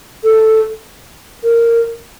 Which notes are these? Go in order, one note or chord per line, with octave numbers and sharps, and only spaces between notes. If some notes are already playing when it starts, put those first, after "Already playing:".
A4
A#4